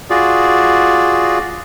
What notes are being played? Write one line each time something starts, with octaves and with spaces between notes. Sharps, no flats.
F4 F#4 G#4 D5